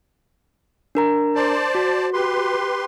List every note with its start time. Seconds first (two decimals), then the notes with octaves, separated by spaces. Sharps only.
0.95 D4 A#4 A#5
1.35 C5 D5 A5
1.75 F#4
2.13 G4 B4 C6